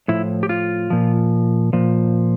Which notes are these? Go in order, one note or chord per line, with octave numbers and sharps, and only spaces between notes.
A2 F3 E4
G4
F4
A#2 F3
A#2 F3